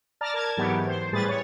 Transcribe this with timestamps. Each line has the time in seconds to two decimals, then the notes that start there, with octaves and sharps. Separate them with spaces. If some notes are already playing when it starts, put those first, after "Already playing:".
0.21 D5 A5 A#5 F6 A6
0.34 A#4 A5 G#6 A6
0.57 G#2 E3 F#3 B3 G4
0.87 C5
1.13 A2 G3 G#4 B4 A6
1.28 C#5